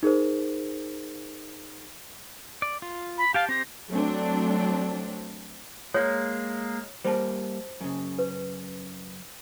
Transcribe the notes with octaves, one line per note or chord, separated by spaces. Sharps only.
D#4 G#4 A#4 C5
D5
F4
B5
G4 F5 G5 A5
C4 G4 C5 A#6
F#3 A3 C4 D4
G#3 A#3 C#5
G3 A#3 C5 A5
F#2 C#3
B4